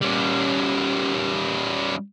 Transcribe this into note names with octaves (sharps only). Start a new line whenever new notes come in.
G3 C#4